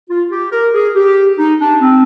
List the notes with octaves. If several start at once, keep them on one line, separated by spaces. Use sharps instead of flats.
F4
G4
A#4
G#4
G4
D#4
D4
C4